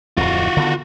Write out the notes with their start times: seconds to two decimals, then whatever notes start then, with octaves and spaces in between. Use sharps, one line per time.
0.17 D1 F2 F4 F#4
0.56 D3 D#3 B3